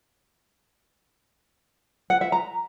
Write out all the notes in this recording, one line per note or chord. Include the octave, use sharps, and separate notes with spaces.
F#5
E5
A#5